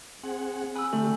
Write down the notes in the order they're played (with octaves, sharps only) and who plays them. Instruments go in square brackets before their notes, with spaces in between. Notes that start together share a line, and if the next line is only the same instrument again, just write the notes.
[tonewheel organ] C4 G#4 F#5
[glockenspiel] G#5 E6 [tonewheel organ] B5 D#6 F#6
[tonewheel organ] D3 G4 [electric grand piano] A3 [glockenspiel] F#7